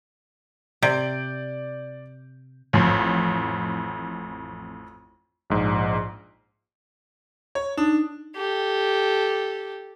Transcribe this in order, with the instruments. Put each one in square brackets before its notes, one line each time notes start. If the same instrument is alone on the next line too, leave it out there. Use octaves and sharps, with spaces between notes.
[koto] C3 [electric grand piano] D5 G6 D7
[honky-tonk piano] A1 F2
[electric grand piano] A#1 G#2
[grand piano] C#5
[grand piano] D4 [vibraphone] D#4
[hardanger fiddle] G4 A4